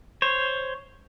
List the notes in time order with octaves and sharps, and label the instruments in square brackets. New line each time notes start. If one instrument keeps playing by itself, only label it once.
[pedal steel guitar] C5 C#5